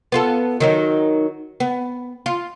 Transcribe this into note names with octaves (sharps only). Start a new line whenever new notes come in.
B3 F4 A4
D#3 F#3 D#4
B3
F4